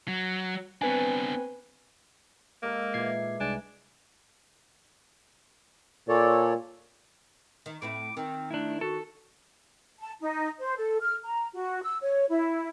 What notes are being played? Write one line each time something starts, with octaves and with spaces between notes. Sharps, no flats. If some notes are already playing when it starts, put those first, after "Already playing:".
F#3
B3 C4 D4 B4 G#5
G#2 A#3 A4 A#4
A#2 E3 D6 G#6 C7
C2 G#3 D4 G#5
A#2 A4 C#5 D5
D#3
A2 C4 E4 D6
D#3 C4
A3 D4 E4
F#4 A4
A5
D#4
C5
A4
F6
A#5
F#4
E6
C#5
E4